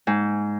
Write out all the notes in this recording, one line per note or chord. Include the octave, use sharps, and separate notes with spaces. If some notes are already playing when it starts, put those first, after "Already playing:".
G#2